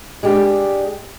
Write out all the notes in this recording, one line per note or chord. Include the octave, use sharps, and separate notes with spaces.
G#3 D4 G4